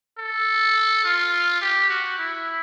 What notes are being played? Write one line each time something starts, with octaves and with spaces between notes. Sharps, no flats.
A4
F4
G4
F#4
E4